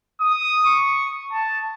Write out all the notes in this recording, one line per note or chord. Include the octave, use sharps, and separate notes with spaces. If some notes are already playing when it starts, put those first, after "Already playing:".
D#6
C#6
A5